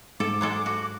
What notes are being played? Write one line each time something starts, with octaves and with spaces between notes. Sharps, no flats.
G#2 A4 D6
F#3 G#3 A4
F#4